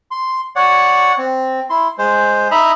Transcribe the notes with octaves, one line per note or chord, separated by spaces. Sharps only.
C6
C#5 D5 F#5
C4
E4 C6
G#3 C5
D#4 D#5 E5 A#5 B5